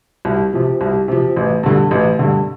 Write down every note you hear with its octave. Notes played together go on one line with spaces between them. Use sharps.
C2
C3 F3
C2
C3 F3
A1
G2 D3
A1
G2 D3